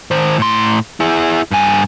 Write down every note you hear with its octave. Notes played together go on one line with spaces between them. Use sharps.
D#3 C5
A2 C6
E4 G#4
G2 G#5